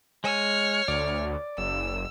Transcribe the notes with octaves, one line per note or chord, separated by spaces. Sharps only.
G#3 C#5 G#5 F6
D2 D5
F#1 E6